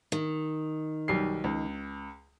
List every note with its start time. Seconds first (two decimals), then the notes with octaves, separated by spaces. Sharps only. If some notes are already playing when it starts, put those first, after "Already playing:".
0.12 D#3
1.08 B1 G3 C7
1.44 C#2